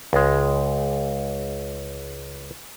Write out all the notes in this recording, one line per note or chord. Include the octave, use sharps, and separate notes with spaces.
C#2 G#3